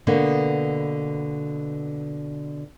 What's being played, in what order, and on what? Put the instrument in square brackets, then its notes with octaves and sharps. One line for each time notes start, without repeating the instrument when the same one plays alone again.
[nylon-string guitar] B2 D3 A#3 B3